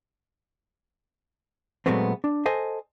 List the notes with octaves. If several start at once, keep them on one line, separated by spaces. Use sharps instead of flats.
A#2 F#3 G#3 A3 B3 C4
D4
A4 C5 D#5 G#5